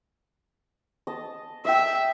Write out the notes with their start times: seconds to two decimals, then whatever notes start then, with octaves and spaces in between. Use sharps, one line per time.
1.07 D#5 A5
1.65 D#5 E5 G5